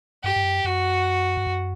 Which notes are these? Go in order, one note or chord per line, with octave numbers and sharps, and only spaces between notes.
G2 G4
G2
F#2
F#2 F#4
G2
F#2